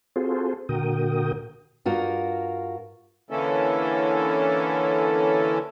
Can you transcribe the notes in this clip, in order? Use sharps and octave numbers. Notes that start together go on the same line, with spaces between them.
C4 F4 F#4 G#4 A4 C5
A#2 D3 F#4 A#4 G5 D#6
G2 F4 F#4 A#4
D3 E3 A#3 C#4 E4 A4